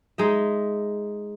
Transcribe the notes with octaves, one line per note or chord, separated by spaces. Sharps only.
G#3 D#4 E5